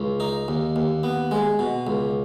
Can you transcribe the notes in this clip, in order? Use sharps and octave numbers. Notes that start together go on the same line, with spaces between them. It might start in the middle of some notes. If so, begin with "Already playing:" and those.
Already playing: C#2
D#4
D#2
D#2
B3
G#3
B2
C#2